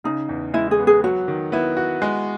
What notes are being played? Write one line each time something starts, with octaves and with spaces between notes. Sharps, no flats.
C#3 D#4
E2
G#3 E4
G#4
B3
G#4
F#3 F#4
D#3
B3 E4
F#4
G#3